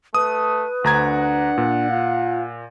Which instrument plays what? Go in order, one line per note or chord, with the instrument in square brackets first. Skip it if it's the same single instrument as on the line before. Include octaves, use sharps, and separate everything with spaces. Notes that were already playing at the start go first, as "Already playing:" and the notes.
[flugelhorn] A3 [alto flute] B4 [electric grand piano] D#6
[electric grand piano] D2 A#5 G#6 [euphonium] D4 [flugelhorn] F#5
[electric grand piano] A#2
[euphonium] F4 [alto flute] F5